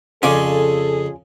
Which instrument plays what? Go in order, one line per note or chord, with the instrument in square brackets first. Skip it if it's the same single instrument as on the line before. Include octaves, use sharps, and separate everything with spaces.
[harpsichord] F2 C#3 G#5 [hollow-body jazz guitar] C#4 F4 D5 [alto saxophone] G#4 [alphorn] A4